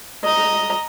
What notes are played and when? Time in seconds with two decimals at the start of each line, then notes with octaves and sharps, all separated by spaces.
0.24 D#5 A#5